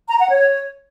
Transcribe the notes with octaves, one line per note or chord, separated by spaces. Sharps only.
A#5
F#5
C#5